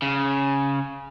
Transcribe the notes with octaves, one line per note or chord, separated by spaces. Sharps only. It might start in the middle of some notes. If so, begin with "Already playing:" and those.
C#3